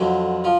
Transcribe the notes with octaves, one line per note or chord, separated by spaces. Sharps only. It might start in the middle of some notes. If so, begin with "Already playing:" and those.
Already playing: F2 D3 F#3
F3